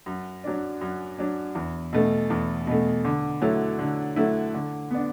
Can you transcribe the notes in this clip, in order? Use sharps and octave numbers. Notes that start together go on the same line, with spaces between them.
F#2
F#3 D4
F#2
F#3 D4
E2
B2 A3
E2
B2 A3
D3
F#3 A3 E4
D3
F#3 A3 E4
D3
B3 D4